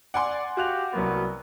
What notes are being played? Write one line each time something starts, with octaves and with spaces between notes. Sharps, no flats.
D5 F#5 G#5 C6
F#4 G4 F5 F#6 F7
C2 F#3 A#3 B3